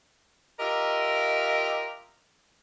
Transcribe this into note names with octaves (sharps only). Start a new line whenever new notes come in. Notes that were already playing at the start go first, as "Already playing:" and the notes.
F4 G4 A#4 D#5 E5